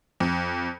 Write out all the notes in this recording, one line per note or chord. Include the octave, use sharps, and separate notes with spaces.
F2